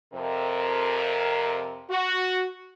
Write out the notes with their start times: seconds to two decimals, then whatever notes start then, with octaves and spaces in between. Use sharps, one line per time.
0.13 F2 C3 A#4
1.89 F#4